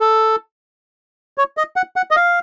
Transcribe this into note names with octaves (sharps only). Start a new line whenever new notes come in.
A4
C#5
D#5
F#5
F#5
D#5
F5